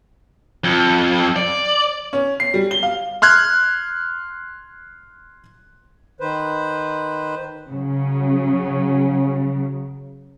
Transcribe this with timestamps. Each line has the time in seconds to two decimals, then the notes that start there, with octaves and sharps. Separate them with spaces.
0.64 F2
1.36 D5
2.13 C#4
2.40 C7
2.54 G3
2.71 G7
2.83 F5
3.22 C6 F6 F#6 G#6
6.20 D#3 B4 C5
7.68 C#3 F#3